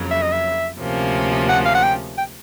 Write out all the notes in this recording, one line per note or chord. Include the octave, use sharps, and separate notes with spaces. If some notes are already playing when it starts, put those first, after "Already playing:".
Already playing: F2 C#3 F#3 A#3
E5
D#5
E5
D2 C3 F3 A#3 C#4
F#5
F5
F#5
G5
G5